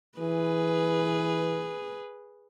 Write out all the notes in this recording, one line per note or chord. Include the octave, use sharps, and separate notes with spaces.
E3 G#4 B4